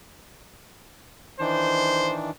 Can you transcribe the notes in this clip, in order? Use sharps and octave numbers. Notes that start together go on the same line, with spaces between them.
D#3 E3 D4 C5